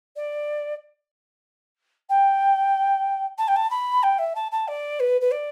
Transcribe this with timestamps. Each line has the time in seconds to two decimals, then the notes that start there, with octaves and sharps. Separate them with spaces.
0.16 D5
2.09 G5
3.38 A5
3.48 G5
3.56 A5
3.70 B5
4.03 G5
4.18 E5
4.35 A5
4.51 A5
4.68 D5
5.00 B4
5.21 B4
5.31 D5